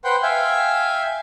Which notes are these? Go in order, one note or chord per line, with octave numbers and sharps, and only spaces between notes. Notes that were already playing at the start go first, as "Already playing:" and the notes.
B4 C5 F#5 G5 C6
E5 F5 G5 G#5